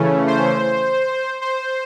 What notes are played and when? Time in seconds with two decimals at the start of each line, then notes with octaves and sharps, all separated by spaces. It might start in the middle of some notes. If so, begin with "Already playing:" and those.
Already playing: C#3 E3 A3 C#4
0.28 C5
1.42 C5